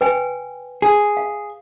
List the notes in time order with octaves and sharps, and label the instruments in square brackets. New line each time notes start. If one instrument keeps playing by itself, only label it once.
[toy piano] B4 G5 G#5
[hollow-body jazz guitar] G#4
[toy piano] F5